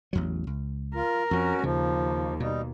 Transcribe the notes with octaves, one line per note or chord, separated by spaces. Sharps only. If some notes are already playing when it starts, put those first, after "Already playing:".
A1 E2 F#3
C#2
F4 A#4
F2 F3 C#4 F#4
D#2 C#3 F3
B2 G3 D#4